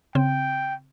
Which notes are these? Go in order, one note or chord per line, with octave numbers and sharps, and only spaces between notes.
C#3 C4 G5